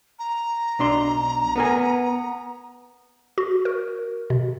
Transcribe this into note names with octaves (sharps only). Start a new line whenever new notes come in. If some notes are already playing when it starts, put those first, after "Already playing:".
A#5
B1 D4 C6
B3 A#4 G#5
F#4
A#4
B2